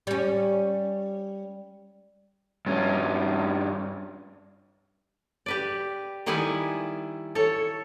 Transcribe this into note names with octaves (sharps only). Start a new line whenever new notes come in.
G3 C#4
G2 C#4
G4 B4 D5
D#3 G3 B3 E4 B4 G#5
A4 C#5